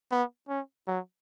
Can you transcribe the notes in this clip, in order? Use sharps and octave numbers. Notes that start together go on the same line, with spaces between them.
B3
C#4
F#3